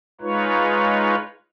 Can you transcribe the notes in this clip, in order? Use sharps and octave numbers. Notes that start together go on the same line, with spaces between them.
G#3 D#4 F4 B4 C#5